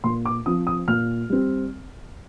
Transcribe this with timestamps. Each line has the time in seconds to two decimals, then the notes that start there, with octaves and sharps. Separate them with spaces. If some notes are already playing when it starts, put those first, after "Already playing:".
0.04 A#2 C6
0.25 D6
0.46 F3 C4 D#6
0.67 D#6
0.88 A#2 F6
1.30 G3 C4